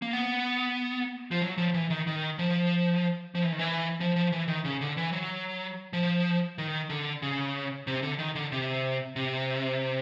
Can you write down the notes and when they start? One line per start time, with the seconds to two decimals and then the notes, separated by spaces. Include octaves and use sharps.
0.02 A#3
0.13 B3
1.31 F3
1.42 F#3
1.58 F3
1.74 E3
1.90 D#3
2.07 D#3
2.39 F3
3.35 F3
3.44 E3
3.52 D#3
3.59 E3
4.00 F3
4.16 F3
4.32 E3
4.48 D#3
4.65 C#3
4.81 D3
4.97 E3
5.13 F#3
5.93 F3
6.58 D#3
6.90 D3
7.22 C#3
7.87 C3
8.02 D3
8.19 D#3
8.35 D3
8.52 C3
9.16 C3